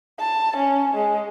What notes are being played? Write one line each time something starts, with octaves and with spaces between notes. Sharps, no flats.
A5
C#4
G#3